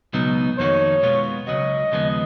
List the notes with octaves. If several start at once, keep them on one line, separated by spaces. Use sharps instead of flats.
C#2 B2 F#3 B3 D#4
F2 D#3 A#3 D#4 F#4 C#5
B2 G#3 B3 F4
C#2 C#3 F#3 C#4 F#4 D#5
D#2 C#3 F3 G#3 B3